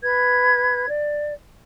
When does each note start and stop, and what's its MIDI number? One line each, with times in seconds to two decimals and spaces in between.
0.03 0.87 71
0.03 0.87 92
0.89 1.34 74